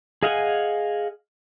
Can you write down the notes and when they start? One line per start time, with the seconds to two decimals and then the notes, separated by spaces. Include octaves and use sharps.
0.23 G#4 D#5 F5 F#5 G#5